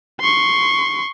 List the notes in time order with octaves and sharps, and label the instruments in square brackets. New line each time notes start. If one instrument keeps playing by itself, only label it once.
[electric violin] C6 C#6